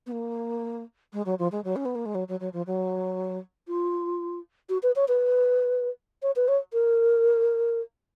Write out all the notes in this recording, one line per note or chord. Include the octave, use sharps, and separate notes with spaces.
B3
A#3
G#3
F#3
F3
G#3
F#3
C#4
B3
A#3
G#3
F#3
F#3
F#3
F3
F#3
F4
F#4
B4
C#5
B4
C#5
B4
C#5
A#4